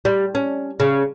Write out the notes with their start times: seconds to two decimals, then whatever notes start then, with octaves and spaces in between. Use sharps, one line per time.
0.05 G3
0.35 C#4
0.80 C#3